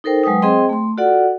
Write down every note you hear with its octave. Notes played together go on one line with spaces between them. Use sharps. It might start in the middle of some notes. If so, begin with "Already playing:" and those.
D#4 A4 A#4 C5 G5
F#3 G#3 B4 G5 D#6
C4 G#4 C5 D#5 G5 C6
A3 C6
F4 F#4 A4 D5 F#5